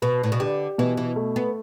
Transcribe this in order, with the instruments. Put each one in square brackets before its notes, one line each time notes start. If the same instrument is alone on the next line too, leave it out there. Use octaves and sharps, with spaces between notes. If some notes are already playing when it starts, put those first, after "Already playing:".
[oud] B2 [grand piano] B4
[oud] A2
B2
[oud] D3 [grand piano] G4
[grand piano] B2 [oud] E3
[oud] E3
[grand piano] A3
[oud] B3